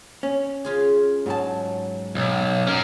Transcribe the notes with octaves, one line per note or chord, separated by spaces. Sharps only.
C#4
C#3 F4 G#4
G#2 F#3 A5
B1
C#4 A#4